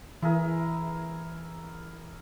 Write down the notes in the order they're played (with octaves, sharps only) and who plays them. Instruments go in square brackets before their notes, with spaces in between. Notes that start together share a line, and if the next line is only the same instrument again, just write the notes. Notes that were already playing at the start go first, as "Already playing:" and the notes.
[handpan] E3 [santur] E4 G#4 A#4